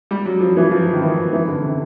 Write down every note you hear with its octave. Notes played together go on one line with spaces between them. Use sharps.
G3
F#3
F3
E3
F3
D#3
E3
E3
D3
C3